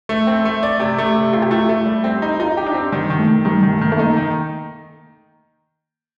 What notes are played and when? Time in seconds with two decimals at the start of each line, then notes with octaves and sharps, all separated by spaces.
0.09 A3
0.27 C4
0.45 A3
0.63 D5
0.80 C3 G4
0.98 A3
1.15 C3
1.33 C3 F4
1.42 G4
1.51 A3 F4
1.69 A3
1.86 G3
2.04 C4
2.22 D#4
2.40 D#4 F4
2.57 G4
2.67 D4
2.74 C4
2.92 D#3 G3
3.10 D#3
3.19 A3
3.27 D#3
3.45 D#3 G3
3.63 D#3
3.73 A3
3.81 D#3
3.92 A3
3.98 A#3 D#4
4.17 D#3